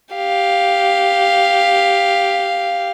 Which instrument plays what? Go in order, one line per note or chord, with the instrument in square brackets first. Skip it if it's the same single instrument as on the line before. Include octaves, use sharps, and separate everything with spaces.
[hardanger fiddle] G4 F5